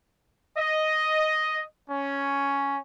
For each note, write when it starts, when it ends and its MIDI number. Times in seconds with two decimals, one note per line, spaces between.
0.57 1.63 75
1.88 2.77 61